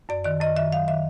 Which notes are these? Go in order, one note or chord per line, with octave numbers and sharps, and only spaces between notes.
F#2 D5
D#3 D5
F#2 D#5
D#3 E5
F#3 F5
D#3 E5